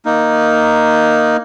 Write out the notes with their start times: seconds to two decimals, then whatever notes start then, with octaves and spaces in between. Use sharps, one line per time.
0.05 A#3 D#4